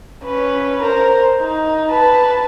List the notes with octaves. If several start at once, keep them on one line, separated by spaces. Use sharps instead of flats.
C#4 B4
A#4 C5
D#4
B4 A5